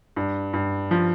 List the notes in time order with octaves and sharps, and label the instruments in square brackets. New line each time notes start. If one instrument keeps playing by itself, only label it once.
[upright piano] G2
G2
F3